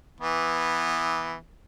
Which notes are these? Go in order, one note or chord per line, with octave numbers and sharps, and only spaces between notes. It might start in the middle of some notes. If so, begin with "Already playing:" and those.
E3 B3